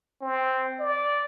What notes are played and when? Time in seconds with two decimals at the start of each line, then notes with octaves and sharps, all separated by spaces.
0.21 C4
0.79 D5